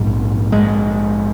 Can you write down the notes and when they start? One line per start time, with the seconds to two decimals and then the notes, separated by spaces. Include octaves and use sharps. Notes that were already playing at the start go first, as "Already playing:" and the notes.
Already playing: A#1 G#2
0.52 G#3